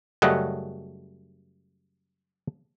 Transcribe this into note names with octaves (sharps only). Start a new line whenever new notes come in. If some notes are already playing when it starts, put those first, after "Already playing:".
F#2 C#3 G3 A3 D#5 F#5